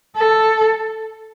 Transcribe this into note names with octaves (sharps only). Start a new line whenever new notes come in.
A4